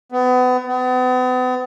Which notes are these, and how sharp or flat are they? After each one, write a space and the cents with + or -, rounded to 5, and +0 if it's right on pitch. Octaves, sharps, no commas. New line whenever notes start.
B3 +30
B3 +40